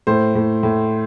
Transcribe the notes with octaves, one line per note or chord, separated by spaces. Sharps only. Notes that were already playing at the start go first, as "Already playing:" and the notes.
A2 C5
A2
A2